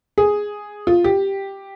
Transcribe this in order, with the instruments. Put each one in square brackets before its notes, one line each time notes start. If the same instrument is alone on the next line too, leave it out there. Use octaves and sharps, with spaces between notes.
[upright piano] G#4
F4
G4